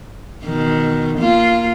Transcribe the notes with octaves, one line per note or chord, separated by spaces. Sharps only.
B2 D#3
A#3 F4